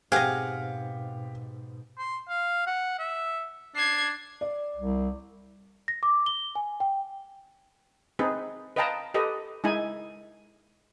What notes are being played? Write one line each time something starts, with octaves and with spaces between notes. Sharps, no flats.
G#2 B2 C4 G4 G#4 D#5 F5 F#5
C6
F5
F#5
E5
D4 G#6 C7
D5
C2
A#6
D6
G7
G#5
G5
C4 D#4 G#4 B4
B4 D#5 F5 G5 A5 A#5
G4 A4 B4 D#5
G#3 D#4 E4 G#5